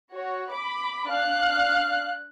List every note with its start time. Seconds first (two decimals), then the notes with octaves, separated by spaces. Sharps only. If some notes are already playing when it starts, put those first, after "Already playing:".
0.11 F#4 C#5
0.51 B5 D6
1.08 D4 F5 F#6